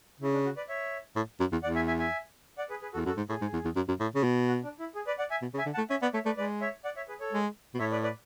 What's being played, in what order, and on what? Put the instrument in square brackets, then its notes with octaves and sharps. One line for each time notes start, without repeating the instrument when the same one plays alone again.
[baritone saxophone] C#3 [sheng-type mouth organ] E4
[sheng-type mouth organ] D4
F#4
B4 D5
C#5 E5
[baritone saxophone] A2
F#2
E2
[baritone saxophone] E2 [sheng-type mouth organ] D5 F#5
[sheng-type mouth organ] E5 G#5
E5 G#5
E5 G#5
D5 F#5
G#4 B4
G#4 B4
F#4 A4
[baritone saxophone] E2
[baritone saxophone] F#2 [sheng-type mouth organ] F#4 A4
[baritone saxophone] G#2
[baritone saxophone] A2 [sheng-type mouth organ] G#4
[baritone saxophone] G#2
E2
E2
F#2
F#2
A2
C#3
B2
[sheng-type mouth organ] F#4
D4
E4
G#4
B4 D5
D5 F#5
E5 G#5
[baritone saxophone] B2
C#3
[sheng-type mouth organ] E5 G#5
[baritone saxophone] D3
[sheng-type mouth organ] F#5 A5
[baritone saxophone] A3
[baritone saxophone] C#4 [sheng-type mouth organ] E5 G#5
[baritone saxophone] B3 [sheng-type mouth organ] D5 F#5
[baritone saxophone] A3 [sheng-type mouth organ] C#5 E5
[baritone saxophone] A3 [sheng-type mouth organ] B4 D5
[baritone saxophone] G#3 [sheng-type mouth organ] B4 D5
[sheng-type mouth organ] C#5 E5
D5 F#5
C#5 E5
G#4 B4
A4 C#5
[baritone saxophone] G#3
B2
[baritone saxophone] A2 [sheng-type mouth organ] C#5 E5
[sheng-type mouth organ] B4 D5
B4 D5